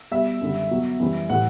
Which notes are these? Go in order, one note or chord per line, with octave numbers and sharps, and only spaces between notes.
B2 G3 E5
F#2 D3 G3
B2 F#3
F#2 E3 G3
A2 E3 G3 F#5